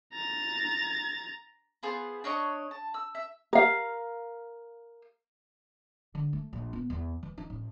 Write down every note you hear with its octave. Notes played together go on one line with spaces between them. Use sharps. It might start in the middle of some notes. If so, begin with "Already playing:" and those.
A#5 A6
B3 F4 G#4 C5
D4 C#5 D#5 C#6
A5
E6
E5
A#4 F5
D3
A3
A#1
B3
E2
E3
D#4
A1